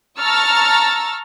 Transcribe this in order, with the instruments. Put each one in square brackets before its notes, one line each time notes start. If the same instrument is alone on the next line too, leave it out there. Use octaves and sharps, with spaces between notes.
[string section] A5 A#5 C#6 E6 F6 A6